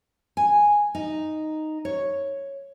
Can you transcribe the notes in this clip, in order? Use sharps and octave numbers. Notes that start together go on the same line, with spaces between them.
G#5
D#4
C#5